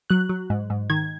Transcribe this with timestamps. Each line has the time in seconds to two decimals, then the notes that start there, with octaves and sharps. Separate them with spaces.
0.10 F#3 F#6
0.29 F#3
0.50 G#2
0.70 G#2
0.90 D#3 G#6